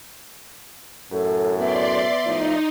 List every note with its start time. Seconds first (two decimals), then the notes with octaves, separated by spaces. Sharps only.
1.12 F#2 A2 A4
1.58 B3 D5 E5 C6
2.25 A2 F3 D#4